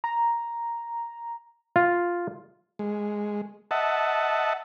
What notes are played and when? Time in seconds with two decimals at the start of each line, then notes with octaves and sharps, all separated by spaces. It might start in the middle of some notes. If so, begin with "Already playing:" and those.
0.04 A#5
1.76 F4
2.79 G#3
3.71 D#5 E5 F#5 A5